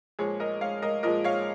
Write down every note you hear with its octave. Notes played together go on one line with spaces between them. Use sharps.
A#2 F3 G#3 G#4 C#5
A#4 D#5
C#5 F5
A#4 D#5
A#2 F3 G#3 A#4 D#5
C#5 F5